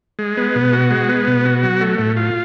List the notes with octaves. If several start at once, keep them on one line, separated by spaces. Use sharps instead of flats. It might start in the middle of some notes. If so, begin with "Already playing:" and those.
G#3
B3
B2
F#4
G#3
B3
B2
F#4
F#3
A3
A2
F4